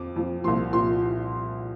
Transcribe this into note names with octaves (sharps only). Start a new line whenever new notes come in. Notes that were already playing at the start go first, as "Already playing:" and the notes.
Already playing: F2 F3 D6
F2 F3
C2 A#2 F3 C6
A#2 F3 C6